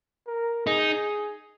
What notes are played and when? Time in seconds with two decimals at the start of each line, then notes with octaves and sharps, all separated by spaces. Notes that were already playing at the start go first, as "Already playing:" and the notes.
0.27 A#4
0.66 D#4 G#4